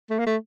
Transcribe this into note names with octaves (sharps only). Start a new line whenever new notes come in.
A3
A#3
A3